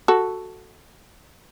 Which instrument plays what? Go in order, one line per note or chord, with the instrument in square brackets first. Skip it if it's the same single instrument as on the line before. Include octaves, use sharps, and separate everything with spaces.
[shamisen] F#4 A4